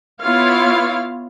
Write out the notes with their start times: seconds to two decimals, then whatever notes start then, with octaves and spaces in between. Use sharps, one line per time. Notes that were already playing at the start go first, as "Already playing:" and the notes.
0.21 B3 E4 F4 C#5 F5